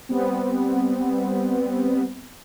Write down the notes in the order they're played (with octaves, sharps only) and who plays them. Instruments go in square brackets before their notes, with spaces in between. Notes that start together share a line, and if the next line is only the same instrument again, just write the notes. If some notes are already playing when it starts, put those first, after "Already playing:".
[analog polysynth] G3 B3 C4